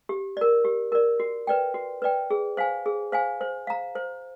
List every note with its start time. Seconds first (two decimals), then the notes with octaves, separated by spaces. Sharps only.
0.09 G4
0.37 A#4 D5
0.65 G4
0.92 A#4 D5
1.20 F#4
1.47 B4 D5 G5
1.74 F#4
2.02 B4 D5 G5
2.30 G#4
2.57 C5 F5 G#5
2.86 G#4
3.12 C5 F5 G#5
3.41 C5
3.67 F5 A#5
3.95 C5